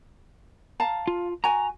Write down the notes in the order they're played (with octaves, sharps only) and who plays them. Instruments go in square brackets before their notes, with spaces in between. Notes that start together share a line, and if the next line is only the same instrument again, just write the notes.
[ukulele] F5 A5 A#5
[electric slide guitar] F4
[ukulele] F#4 G#5 [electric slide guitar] A#5